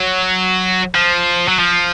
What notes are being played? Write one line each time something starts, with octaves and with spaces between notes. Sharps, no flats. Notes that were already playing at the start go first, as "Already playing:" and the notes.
Already playing: F#3
F3
F#3
F3